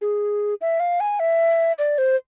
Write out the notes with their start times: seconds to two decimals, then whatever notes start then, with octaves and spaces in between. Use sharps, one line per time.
0.01 G#4
0.61 E5
0.80 F5
1.00 G#5
1.20 E5
1.79 D5
1.98 C5